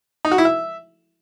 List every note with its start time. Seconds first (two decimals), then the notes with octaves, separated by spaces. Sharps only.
0.25 D#4
0.31 F#4
0.38 E4
0.45 E5